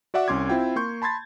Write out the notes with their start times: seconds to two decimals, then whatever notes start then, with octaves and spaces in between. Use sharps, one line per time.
0.14 F#4 D5 E5 F#5 D6
0.28 C2 C#4 C6 D6 G#6
0.49 C4 E4 F4 G5
0.76 A#3 C6 C#6 G6
1.02 A5 B5 C6 G#6 A6